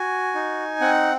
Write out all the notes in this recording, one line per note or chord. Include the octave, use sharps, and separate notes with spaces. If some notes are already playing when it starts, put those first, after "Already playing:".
Already playing: F#4 G#5
D#4
C4 F#5